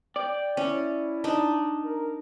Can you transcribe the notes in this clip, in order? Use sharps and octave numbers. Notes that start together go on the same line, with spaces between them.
D5 G5
C#4 E4
D4 D#4
A#4